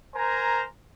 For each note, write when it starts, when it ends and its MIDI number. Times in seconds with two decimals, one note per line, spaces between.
0.15 0.64 70
0.15 0.64 72
0.15 0.64 80
0.15 0.64 82